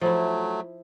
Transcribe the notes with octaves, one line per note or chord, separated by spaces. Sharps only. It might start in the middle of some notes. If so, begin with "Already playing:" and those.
F3 F#3 A3 E4